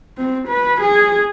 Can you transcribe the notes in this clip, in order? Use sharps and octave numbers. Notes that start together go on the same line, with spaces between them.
C4
B4
G#4